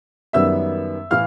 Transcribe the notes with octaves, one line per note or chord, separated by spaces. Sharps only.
F#2 D#3 G3 B3 E5 E6
A2 E3 F5 F6